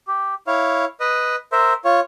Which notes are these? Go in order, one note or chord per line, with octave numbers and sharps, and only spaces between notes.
G4
E4 C#5 F5
B4 D#5
A#4 C5 E5
F4 C#5